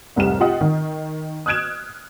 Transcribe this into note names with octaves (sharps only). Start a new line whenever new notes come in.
F1 C2 G#2 G3 F6 E7
F4 G4 D#5 F#5 D#6
D#3
D#6 F6 F#6 G#6 D7 E7